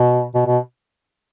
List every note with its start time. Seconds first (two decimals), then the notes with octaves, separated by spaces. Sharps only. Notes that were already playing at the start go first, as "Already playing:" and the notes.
Already playing: B2
0.35 B2
0.47 B2